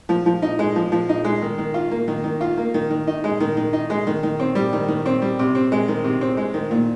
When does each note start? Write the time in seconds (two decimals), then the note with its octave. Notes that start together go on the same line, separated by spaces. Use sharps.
0.09 F3
0.26 F3
0.42 D#4
0.59 G#3
0.76 F3
0.92 F3
1.09 D#4
1.25 G#3
1.42 D#3
1.58 D#3
1.74 F4
1.91 A#3
2.08 D#3
2.24 D#3
2.41 F4
2.58 A#3
2.74 D#3
2.90 D#3
3.07 D#4
3.24 G#3
3.40 D#3
3.57 D#3
3.73 D#4
3.90 G#3
4.07 D#3
4.23 D#3
4.39 C4
4.55 G3
4.73 D#3
4.88 D#3
5.06 C4
5.22 G3
5.39 C3
5.55 C4
5.72 G#3
5.88 D#3
6.04 C3
6.21 C4
6.37 G#3
6.54 D#3
6.71 A#2